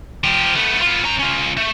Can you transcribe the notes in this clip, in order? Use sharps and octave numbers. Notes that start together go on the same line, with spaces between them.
F3 G4
A3 B3
B3 F4
C#4 A#5
C#4 F4
A3